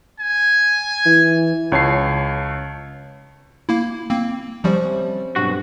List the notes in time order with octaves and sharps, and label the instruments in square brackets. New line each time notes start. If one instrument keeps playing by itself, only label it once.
[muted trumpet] G#5
[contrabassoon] E3
[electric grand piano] C#2 C#5 A5 C7
[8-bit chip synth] A#3 E4
A#3 C4
[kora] C3 C#4 [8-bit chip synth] F3 G3
[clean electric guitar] B1 F#4 [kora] G2